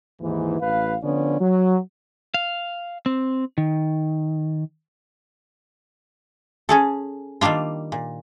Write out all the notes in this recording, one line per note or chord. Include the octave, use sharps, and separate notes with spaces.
D#2 G#2 E3
A1 B4 F5
D3 F3 B3 C#4 D5
F#3
F5
C4
D#3
C#4 G#4 A4
D#3 G3 A#3 D4 F4
A#2